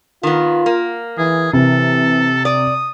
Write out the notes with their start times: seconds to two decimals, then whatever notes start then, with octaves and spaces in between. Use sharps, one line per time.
0.23 D#3 B3 F4
0.66 A#3
1.18 E3 G#4
1.53 C3 E3 A4
2.45 D5 D#6